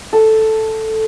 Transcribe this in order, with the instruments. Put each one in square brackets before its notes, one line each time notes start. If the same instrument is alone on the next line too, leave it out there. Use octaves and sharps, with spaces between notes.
[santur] A4